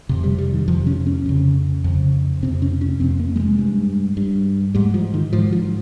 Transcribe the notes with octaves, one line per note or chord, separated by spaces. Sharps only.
F2 C3
G3
G3
D#3
F2 C3 F3
C#4
C#4
F2 C#3
F2 C#3
F2 C3 C4
C#4
C#4
F2 C3 C4
A#3
G3
G#3
G2
G2
G#2 G3
F3
D#3
G#2 F3
F3